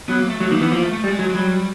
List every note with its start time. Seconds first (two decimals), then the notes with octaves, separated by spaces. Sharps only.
0.09 F#3 B3
0.20 A#3
0.29 A3
0.40 F#3 A3
0.50 D#3 A#3
0.61 E3 B3
0.72 F3 A#3
0.83 A3
0.93 A3
1.03 G3 G#3
1.19 F#3
1.29 G#3
1.35 F#3 G3